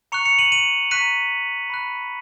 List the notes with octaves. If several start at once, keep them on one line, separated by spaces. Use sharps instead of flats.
A#5 C#6 F#6 C#7 F7
C#7 F7
D#7 F#7
D#7 F#7
A#5 C#6 F#6 B6 D#7
B5 F#6